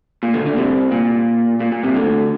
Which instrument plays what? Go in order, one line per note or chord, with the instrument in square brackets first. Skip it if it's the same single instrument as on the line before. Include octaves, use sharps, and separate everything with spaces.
[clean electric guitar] A#2
D2 D3
D2 D3
C2 C3
A#2
A#2
A#2
C2 C3
D2 D3